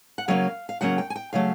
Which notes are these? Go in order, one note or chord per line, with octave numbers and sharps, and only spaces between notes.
F#5
C#3 F#3 A#3 C#4 F5
F5
C#3 F#3 A#3 C#4 F#5
G5
G#5
G5
C#3 F#3 A3 F5